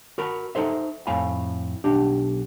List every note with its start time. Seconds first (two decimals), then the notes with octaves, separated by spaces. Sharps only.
0.18 F#4 A#4 B5
0.55 D#4 A4 C5 E5
1.07 F2 A2 F5 G#5 B5
1.84 B1 D4 G4